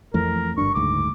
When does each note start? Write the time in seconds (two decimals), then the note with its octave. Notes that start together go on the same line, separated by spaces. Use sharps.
0.14 F2 E3 A3 A#4
0.58 G1 G2 D4 C#6
0.75 F#1 D2 G#2 D6